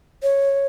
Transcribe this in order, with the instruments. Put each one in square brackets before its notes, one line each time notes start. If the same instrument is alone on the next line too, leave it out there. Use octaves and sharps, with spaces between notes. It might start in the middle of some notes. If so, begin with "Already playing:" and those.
[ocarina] C#5